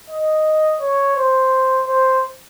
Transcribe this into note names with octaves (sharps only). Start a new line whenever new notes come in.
D#5
C#5
C5
C5